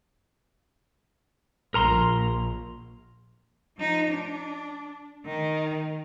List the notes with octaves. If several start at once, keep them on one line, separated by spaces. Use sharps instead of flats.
A#1 A#4 A#5 C6
F3 D#4
D4
D#3